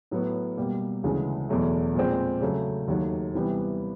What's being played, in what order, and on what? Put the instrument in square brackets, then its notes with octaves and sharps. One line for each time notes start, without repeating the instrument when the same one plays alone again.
[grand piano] A2 F#3 B3
B2 G3 A#3
D2 C#3 E3 G#3
E2 B2 F#3 A3
A#2 F3 G#3 C4
C#3 F#3 A3
D#2 D#3 F#3 A3
C3 E3 G3 B3